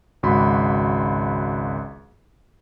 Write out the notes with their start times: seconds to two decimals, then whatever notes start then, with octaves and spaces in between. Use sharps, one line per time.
0.23 G#1 C#2 F#4 B5 C6